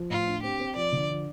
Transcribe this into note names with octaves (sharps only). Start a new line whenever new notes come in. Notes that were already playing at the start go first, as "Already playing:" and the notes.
Already playing: F3
A2 F4
D4
C4 G4
C4
F3 D5
D3
F3